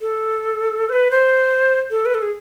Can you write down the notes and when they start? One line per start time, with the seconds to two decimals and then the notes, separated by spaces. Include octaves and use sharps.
0.01 A4
0.89 C5
0.93 B4
1.11 C5
1.91 A4
2.06 B4
2.14 A4
2.22 G#4